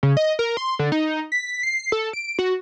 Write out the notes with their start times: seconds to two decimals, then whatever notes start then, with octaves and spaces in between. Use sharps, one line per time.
0.03 C#3
0.17 D#5
0.39 A#4
0.57 C6
0.79 D3
0.92 D#4
1.32 B6
1.63 C7
1.92 A4
2.13 D7
2.39 F#4